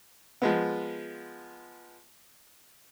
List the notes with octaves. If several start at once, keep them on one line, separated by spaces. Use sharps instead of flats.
F3 G#3 B3